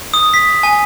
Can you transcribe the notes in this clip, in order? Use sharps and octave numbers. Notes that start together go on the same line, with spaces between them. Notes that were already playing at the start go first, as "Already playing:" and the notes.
D#6
B6
G#5